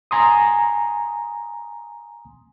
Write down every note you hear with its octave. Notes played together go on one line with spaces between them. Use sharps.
G#5 A#5 C6 D#6